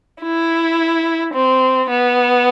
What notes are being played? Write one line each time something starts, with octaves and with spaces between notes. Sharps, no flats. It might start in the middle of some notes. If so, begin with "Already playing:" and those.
E4
C4
B3